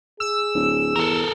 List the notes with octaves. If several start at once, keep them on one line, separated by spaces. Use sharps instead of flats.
G#4 E6
D1
E2 A4 A#4